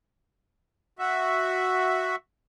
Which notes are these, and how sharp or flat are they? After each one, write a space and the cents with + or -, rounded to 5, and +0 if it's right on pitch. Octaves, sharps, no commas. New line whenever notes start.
F#4 +0 E5 +0